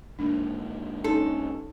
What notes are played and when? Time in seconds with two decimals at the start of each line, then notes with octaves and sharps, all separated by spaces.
0.19 G#2 D3 A#3 D4
1.04 C#4 D#4 A4